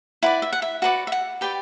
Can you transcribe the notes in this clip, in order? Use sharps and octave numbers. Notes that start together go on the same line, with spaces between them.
E4 B4 D5 F#5
E5
F#5
E5
F#4 B4 D5 F#5
E5
F#5
G4 B4 D5 G5